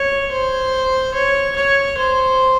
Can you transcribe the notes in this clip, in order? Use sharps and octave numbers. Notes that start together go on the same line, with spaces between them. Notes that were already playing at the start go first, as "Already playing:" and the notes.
Already playing: C#5
C5
C#5
C#5
C5